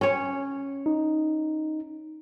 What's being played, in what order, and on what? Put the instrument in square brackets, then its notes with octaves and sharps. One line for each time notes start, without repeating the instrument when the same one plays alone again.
[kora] C#4 C#5
[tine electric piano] D#4